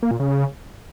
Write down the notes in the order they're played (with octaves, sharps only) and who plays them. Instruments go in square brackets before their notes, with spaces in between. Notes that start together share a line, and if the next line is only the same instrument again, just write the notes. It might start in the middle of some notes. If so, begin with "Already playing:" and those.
[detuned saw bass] A#3
A#2
C#3